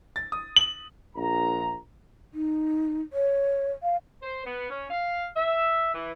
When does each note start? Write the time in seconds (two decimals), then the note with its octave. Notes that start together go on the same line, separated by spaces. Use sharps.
0.16 A6
0.32 D#6
0.56 F#7
1.15 A#1 A#5
2.34 D#4
3.13 C#5
3.83 F5
4.23 C5
4.46 B3
4.70 C#4
4.90 F5
5.36 E5
5.94 E3